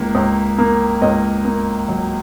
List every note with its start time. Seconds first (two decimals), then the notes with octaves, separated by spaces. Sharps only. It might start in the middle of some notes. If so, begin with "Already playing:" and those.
Already playing: C#2 A#3
0.15 C#2
0.58 A#3
1.02 C#2 D#5
1.45 A#3
1.88 F#3